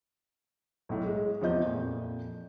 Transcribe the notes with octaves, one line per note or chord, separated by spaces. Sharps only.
B1 A2
G#3
E2 C3 F3 D#5 G6
F2 A#2